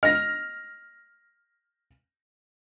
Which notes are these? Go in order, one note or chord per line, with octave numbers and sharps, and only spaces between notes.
D#5 F6 A#6